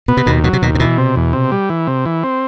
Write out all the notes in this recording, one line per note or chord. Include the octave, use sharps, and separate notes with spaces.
B2 B3
C3
D#2 B2
B2 F#3
C3
D#2 B2
C3
B2 E3
C3
E2
C3
G3
E3
C3
E3
C4